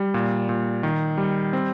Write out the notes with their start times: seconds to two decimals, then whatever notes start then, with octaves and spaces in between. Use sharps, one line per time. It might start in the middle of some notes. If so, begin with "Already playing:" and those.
Already playing: G3
0.14 A#2
0.49 A#2
0.83 D#3
1.18 G3
1.53 C4